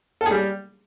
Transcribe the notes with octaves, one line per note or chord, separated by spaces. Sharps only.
A4
G#4
G3